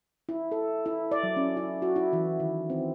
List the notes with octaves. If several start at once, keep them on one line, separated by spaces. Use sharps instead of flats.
E4
A4
E4
D5
F#3
C#4
E4
F#4
E4
E3
D#3
C4